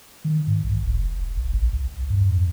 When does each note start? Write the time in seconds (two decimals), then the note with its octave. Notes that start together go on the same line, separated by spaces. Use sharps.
0.25 D#3
0.47 G#2
0.64 B1
0.84 F1
1.18 D#1
1.36 B1
1.53 A1
1.73 C#2
2.10 G2
2.26 F2